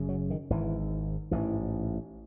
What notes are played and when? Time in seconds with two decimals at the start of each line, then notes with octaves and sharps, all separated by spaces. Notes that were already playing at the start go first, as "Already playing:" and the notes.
Already playing: F#1 F#2 C#3
0.09 F#3
0.30 D#3
0.50 G#1 G#2 E3
1.31 A1 G#2 E3